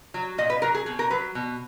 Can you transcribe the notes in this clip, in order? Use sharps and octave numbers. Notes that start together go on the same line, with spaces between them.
F#3
A#2 D#5
B4
F#3 A#4
G#4
B2 G#4
A#4
F#3 B4
B2